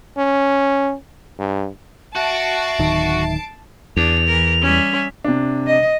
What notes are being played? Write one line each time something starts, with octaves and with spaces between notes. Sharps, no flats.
C#4
G2
F#4 E5 A5 C7 D7
D1 D#3
E2 D4 F7
E3 A#4
G3 C#4 E5
C3 D4
D#5